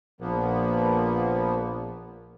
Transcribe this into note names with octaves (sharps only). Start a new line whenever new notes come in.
A#1 F3 A#3 B3